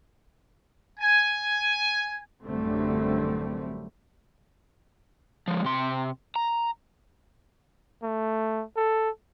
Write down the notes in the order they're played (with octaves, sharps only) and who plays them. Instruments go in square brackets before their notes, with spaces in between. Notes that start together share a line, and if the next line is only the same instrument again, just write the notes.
[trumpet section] G#5
[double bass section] A1 F#2 D3 G3 A3 C4
[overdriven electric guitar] F3 G#3
C3 C6
A#5
[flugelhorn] A3
A4